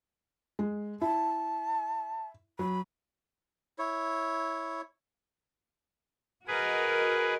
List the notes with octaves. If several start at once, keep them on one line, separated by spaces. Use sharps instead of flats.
G#3
E4 A5
F#3 B5
E4 C#5
F#4 G#4 A#4 B4 D#5